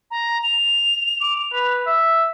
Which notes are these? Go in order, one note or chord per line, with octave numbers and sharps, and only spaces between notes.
A#5
F7
D6
B4
E5